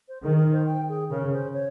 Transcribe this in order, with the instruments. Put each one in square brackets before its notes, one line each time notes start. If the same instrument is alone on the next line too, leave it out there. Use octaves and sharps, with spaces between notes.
[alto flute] C5
[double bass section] D#3 [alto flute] G#4
[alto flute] A#4
C5
G5
G#4
[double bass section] C#3 [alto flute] A#4
[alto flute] C5
C#5